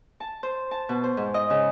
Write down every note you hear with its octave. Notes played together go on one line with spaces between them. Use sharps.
A5
C5
A5
B2
C5
G#2
D#5
C#3